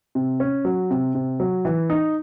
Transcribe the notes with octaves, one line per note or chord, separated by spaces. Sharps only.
C3
C#4
F#3
C3
C3
F#3
E3
D#4